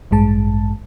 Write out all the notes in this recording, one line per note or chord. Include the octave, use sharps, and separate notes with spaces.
A1 G2 G#3 A5